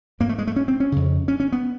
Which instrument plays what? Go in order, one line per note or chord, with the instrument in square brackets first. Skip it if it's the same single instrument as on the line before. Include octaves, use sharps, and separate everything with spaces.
[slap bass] G#2 A#3
A3
G#3
A3
C#4
C4
C#4
F2 C#3
C#4
C#4
B3